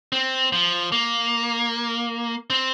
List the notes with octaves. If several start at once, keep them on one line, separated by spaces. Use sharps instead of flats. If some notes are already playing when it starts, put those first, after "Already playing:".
C4
F3
A#3
C4